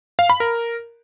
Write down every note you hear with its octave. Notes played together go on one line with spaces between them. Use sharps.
F5
B5
A#4